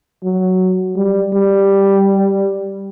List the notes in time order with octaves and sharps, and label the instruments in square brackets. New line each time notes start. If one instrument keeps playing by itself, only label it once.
[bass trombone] F#3
G3
G3